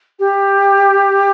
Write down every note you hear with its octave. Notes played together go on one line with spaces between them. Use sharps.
G4